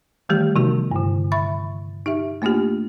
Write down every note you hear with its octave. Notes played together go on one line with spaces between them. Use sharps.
D#3 E3 G3 A3 G4
C3 F3 B3 D#4 F#4
G2 D3
E5 B5 C#6 A6
D#4 G4 E5
A3 A#3 D4 F4 G4